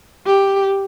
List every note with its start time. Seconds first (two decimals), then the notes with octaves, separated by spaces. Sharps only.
0.26 G4